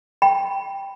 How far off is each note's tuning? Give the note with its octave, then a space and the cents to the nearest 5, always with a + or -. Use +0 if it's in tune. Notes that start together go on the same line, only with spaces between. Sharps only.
G5 +0 B5 +0